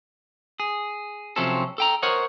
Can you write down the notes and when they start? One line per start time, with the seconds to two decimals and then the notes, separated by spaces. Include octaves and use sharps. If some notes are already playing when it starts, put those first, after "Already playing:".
0.60 G#4
1.36 C3 F3 F#3 C4 C#4 A4
1.78 A4 G5 A#5
2.03 A#4 C5 C#5 D#5 F#5